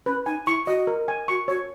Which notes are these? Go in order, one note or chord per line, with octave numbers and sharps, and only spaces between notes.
C#4 B4
D#4 G#5
E4 C#6
F#4 D#5
A#4
G#5
F#4 C#6
F#4 C#5